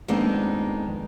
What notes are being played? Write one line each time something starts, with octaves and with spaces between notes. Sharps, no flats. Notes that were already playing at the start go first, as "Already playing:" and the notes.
F2 D#3 G#3 A#3 B3 D4